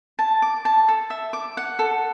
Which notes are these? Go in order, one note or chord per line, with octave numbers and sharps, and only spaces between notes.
A5
D6
A5
A4
E5
D6
F#5
A4